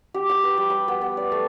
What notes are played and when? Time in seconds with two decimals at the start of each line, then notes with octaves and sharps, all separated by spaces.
0.14 G4
0.30 G5
0.43 B4
0.58 G3
0.70 B5
0.88 B3
1.01 B3
1.17 D5
1.32 A3